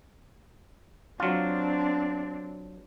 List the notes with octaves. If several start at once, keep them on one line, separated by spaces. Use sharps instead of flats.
F#3 C4 D4 F4